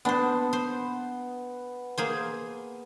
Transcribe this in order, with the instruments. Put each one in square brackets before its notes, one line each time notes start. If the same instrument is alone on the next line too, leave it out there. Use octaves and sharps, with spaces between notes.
[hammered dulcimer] B3 A5 [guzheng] D4 C5
[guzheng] C5
A#3 G#4 C5